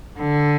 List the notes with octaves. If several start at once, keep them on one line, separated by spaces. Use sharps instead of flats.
D3